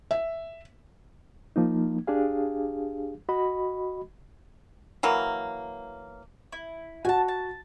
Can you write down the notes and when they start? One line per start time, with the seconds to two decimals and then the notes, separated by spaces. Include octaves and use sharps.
0.11 E5
1.56 F3 A#3 D#4
2.07 D4 G4 G#4 F5
3.29 F#4 D#5 B5
5.03 E3 F#3 A#3
6.52 E4
7.05 F#4 F#5 G#5 A5
7.28 A5